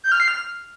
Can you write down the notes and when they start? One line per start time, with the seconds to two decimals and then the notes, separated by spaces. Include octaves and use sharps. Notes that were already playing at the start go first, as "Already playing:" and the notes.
0.04 G6
0.12 F6
0.20 C7
0.28 F6